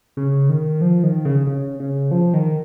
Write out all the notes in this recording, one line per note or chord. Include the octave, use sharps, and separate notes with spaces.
C#3
D#3
F3
D#3
C#3
C#3
C#3
F3
D#3